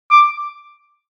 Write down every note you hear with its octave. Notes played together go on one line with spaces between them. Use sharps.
D6